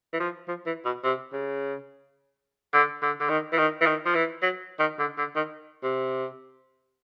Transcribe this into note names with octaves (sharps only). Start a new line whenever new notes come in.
E3
F3
F3
E3
B2
C3
C#3
D3
D3
D3
D#3
E3
D#3
E3
D#3
F3
E3
F#3
D#3
D3
D3
D#3
C3